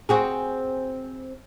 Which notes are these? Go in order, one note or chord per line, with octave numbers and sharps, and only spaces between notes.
C4 F#4 G#4